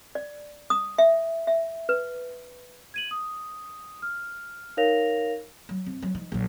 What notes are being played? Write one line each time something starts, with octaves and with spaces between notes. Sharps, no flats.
D5
D#6
E5
E5
B4
G#6 D#7 F#7
D#6
F6
D#4 A#4 C#5 F5 A#6 F7
F#3
F2
F#3
F3 D#4
A#1 F#3